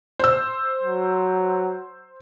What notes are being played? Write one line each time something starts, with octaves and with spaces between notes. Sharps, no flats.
C5 E6
F#3